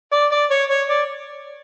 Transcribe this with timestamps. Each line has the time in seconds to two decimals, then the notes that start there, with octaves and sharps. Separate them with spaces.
0.12 D5
0.32 D5
0.50 C#5
0.69 C#5
0.89 D5